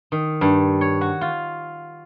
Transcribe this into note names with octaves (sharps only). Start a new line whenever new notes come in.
D#3
G2
C#5
F#4
F4